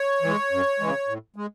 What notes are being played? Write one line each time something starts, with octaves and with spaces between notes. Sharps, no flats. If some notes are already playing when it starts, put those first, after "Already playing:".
Already playing: C#5
E3 G#3
F#2
C#3 E3 G#3
A2
G#3